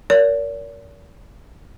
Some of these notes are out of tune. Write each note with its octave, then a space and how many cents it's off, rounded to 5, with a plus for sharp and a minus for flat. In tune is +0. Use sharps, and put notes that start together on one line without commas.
A#4 +0 D5 -45